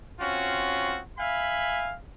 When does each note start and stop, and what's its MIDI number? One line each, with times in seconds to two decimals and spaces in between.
0.20 1.00 60
0.20 1.00 61
0.20 1.00 65
0.20 1.00 66
1.18 1.94 76
1.18 1.94 77
1.18 1.94 80
1.18 1.94 83